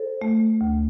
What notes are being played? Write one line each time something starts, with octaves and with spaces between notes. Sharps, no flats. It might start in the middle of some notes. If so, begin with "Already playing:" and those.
Already playing: A4 C5
A3
D2